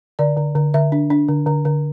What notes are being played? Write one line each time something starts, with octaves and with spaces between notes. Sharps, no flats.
D3 D5
D3
D3
D3 E5
D4
D4
D3
D3
D3